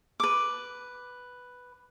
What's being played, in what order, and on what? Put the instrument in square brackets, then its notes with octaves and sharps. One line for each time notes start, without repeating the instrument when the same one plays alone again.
[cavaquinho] B4 D6